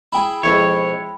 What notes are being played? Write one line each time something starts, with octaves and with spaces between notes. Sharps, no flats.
E4 G#4 G5 B5
F2 B2 G#3 E4 C#5